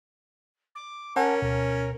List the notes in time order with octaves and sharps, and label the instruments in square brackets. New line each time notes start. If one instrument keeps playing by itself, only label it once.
[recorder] D6
[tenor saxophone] C#4 [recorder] A#4 [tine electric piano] F#5 G#5 A5
[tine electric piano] D2 B2 [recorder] A#4